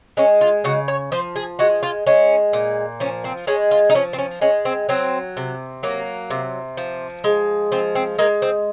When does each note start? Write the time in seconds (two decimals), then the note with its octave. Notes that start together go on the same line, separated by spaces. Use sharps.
0.17 G#3 C#4
0.41 F4
0.64 C#3 F#4
0.88 C#5
1.12 F3 C5
1.36 G#4
1.59 G#3 F#4
1.83 F4
2.07 G#3 C#4
2.53 A#2
3.00 F3 C#4
3.24 C4
3.47 G#3 C#4
3.71 F4
3.90 D#4
3.94 F3 C#4
4.13 C4
4.18 C#4
4.41 G#3 C#4
4.65 C4
4.89 F#3 C4
5.37 C3
5.83 F#3 A#3
6.30 C3
6.77 F3
7.24 G#3
7.72 F3 C4
7.95 C4
8.18 G#3 A#3
8.42 C4